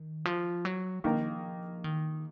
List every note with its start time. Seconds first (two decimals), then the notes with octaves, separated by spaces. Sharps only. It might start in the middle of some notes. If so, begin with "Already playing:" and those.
Already playing: D#3
0.25 F3
0.65 F#3
1.04 D#3 F3 A#3 D#4 A#4
1.84 D#3